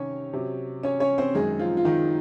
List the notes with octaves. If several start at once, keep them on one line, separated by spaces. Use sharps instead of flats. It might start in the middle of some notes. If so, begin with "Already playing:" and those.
Already playing: C3 D#3 C#4 C#5
C3 F#3
C#4 C#5
C#4 C#5
C4 C5
F#2 D#3 G#3 G#4
F3 F4
F4
D#3 D#4